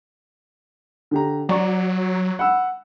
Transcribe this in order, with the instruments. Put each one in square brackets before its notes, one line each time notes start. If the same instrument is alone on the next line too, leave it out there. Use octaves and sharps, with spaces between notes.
[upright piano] D3 G4 A#5
[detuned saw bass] F#3 [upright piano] D5 A#5 C#6
[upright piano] F#5 B5 E6